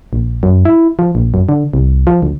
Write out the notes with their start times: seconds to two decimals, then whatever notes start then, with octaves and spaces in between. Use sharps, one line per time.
0.13 A#1
0.43 F#2
0.65 E4
0.99 F3
1.15 A#1
1.34 F#2
1.49 D3
1.74 C2
2.07 F3
2.23 D2